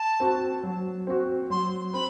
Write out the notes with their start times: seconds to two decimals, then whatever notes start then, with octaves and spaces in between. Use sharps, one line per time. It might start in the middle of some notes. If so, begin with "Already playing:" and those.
Already playing: A5
0.20 C4 F#4
0.63 F#3
1.07 C4 F#4
1.50 F#3 C6
1.93 C4 B5